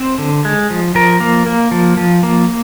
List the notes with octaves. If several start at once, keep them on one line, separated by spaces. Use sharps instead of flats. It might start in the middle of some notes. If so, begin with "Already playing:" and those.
Already playing: C4 C5
D3
G#3
F3
F3 A#4
A#3
A#3
F3
F3
A#3